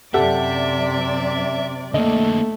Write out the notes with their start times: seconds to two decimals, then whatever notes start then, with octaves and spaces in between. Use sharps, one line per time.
0.14 F#2 C3 G4 A4 D5 E5 F#5
1.94 D3 A3 A#3 D#5